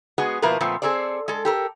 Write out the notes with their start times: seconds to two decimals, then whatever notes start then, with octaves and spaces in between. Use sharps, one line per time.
0.18 G#3 B3 F#4 G#4
0.42 B2 F3 A#3 E4 A#4 B4
0.61 A#2 F3 A3 B3 C4
0.82 C4 G#4 A4 C5 D5
1.28 G#3 A4
1.45 G4 A4 A#4